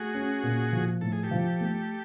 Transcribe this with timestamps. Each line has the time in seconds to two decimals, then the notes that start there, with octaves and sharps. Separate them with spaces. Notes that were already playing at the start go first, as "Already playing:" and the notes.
Already playing: A3 F#4 G#4
0.14 C#4
0.43 A#2
0.72 F3
1.01 A2 A4
1.12 G#4
1.23 G4 A4
1.31 F3
1.61 A3